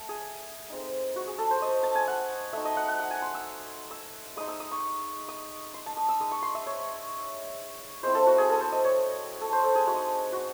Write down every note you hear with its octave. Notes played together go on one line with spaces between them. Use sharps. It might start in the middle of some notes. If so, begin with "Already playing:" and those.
Already playing: A3
G#4
G#3 C4 D#4
F#4
G#4
A4
C5
D#5
A5
G#5
F#5
A3 D#4 E5
D#5
F#5
F#5
F#5
G#5
C6
E6
E6
G#3 D#4 D#6
E6
D#6
C#6
D#6
C6
A5
D#6
E6
G#3 D#4 D#6
C#6
C6
E5
C#5
G#3 C4 E4 C5
A4
F#4
G#4
A4
C5
D#5
C#5
A4
C5
A4
G#4
G#3 D#4 F#4
F#4